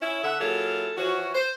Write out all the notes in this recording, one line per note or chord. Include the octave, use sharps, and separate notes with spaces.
C#4 E4
D3 E5 F#5
F#3 A#3 E4 F4 G#4 A4
E3 F3 C#4 F#4
C5